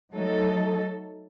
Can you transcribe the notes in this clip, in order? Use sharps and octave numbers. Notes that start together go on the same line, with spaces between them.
F#3 A3 D#4 A4